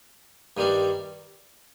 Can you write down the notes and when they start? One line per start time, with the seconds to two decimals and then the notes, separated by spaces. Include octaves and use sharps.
0.57 G2 D#3 G3 D4